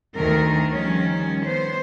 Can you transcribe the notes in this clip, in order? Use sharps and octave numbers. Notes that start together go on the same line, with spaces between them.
D2 D#3 A3 A#4
D#3 F3 G3 C#4
B3 C5